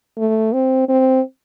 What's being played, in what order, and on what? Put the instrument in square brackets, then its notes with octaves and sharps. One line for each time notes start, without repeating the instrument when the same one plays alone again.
[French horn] A3
C4
C4